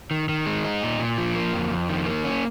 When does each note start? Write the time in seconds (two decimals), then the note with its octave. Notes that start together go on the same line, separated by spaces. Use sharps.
0.11 D#3
0.29 D#3
0.46 G#3
0.64 D#4
0.83 A#2
0.99 A#2
1.18 F3
1.35 A#3
1.53 F2
1.70 F2
1.89 D#3
2.06 A#3
2.24 C#4